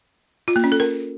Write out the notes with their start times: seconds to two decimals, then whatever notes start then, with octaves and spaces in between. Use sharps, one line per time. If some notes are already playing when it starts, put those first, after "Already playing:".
0.48 F4
0.56 A#3
0.64 C#4
0.72 A4
0.80 A#4